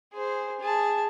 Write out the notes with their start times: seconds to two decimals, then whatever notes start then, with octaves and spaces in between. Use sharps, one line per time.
0.13 G#4 C5
0.60 G#4 A5